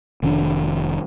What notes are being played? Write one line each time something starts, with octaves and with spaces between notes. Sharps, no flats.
F1 D#3 C#4 D4